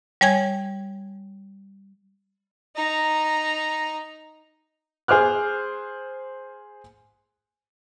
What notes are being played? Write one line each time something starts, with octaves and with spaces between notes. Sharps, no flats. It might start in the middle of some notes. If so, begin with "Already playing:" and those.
G3 C#5 G#5 G#6
D#4 A#5
G#4 C5 D6 F6 F#6